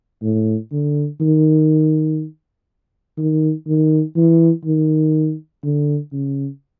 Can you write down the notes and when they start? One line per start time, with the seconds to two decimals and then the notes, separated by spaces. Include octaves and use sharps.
0.22 A2
0.72 D3
1.21 D#3
3.18 D#3
3.67 D#3
4.16 E3
4.65 D#3
5.64 D3
6.13 C#3